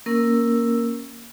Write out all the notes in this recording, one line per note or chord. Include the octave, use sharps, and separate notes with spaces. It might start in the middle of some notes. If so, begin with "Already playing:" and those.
A#3 C#4 A#4 E6